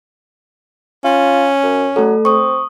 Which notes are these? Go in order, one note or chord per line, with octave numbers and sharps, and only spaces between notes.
C#4 F4
F#2
F#3 A3 A4
C4 C#6 D#6